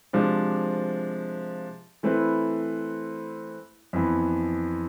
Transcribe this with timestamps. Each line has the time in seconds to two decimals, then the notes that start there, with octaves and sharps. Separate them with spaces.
0.13 C3 F3 G#3 D4
2.03 E3 A3 C4 E4 B4
3.93 F2 E3 B3